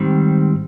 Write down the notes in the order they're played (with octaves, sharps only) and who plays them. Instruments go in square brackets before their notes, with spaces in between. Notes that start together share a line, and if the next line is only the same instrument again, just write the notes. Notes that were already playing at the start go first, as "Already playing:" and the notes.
Already playing: [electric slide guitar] G#2 D#3 G3 C4